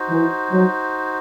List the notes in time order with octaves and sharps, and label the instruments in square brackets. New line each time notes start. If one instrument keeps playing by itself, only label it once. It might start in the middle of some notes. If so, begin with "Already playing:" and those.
Already playing: [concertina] D#4 F#4 C5
[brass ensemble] E3
F#3